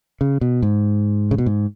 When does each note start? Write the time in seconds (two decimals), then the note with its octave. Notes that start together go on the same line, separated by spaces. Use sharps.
0.21 C#3
0.41 B2
0.62 G#2
1.31 C#3
1.38 B2
1.46 G#2